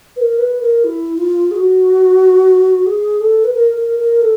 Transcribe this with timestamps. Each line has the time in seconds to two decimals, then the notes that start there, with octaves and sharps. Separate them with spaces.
0.16 B4
0.20 A#4
0.39 B4
0.61 A#4
0.84 E4
1.18 F4
1.51 G#4
1.56 F#4
2.86 G#4
3.20 A4
3.44 B4
3.54 A#4
3.77 A#4
3.99 A#4
4.21 A4